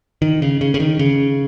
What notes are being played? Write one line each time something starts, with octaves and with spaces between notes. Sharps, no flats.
D#3
C#3
C#3
C#3
D#3
C#3